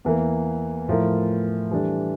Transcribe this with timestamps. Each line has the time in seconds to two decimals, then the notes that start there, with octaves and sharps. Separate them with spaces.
0.05 E2 E3 A#3
0.88 A2 F3 A3 E4 A#4
1.72 E3 G3 D4 A4